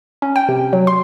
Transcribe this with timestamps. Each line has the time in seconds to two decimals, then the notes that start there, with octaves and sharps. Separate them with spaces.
0.22 C#4
0.36 G5
0.49 C3
0.73 F#3
0.87 C6